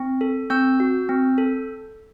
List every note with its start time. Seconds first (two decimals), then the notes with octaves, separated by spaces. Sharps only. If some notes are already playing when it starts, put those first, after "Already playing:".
Already playing: C4
0.21 A4
0.50 C4 E6 G6
0.80 F#4
1.09 C4
1.38 A4